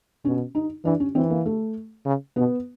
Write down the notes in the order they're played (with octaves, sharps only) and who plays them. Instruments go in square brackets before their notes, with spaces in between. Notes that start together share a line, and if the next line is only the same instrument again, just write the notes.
[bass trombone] B2 [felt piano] C#4
[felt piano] D#4
[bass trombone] E3 [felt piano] D4
[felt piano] C#4
[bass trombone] E3 [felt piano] C4
[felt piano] A#3
A3
[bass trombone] C#3
[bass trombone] B2 [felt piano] B3